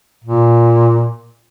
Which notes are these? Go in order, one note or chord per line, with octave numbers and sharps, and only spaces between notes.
A#2